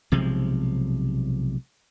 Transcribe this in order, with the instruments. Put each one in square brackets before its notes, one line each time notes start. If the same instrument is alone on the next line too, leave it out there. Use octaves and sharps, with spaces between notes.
[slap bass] B1 C3 F3 G#3